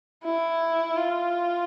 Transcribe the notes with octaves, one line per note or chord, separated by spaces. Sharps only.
E4
F4